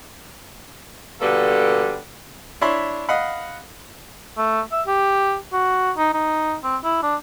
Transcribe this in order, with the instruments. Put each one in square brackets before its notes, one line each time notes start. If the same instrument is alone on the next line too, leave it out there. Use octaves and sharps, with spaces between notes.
[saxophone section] B2 D3 G3 A#3 A4
[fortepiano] D4 E4 C#5 B5 C6
D#5 F5 F#5 B5
[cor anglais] A3
E5
G4
F#4
D#4
D#4
C4
E4
D4